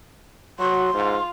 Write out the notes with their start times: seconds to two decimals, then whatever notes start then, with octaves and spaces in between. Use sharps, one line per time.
0.59 F#3 F#4 C6
0.94 G#2 F4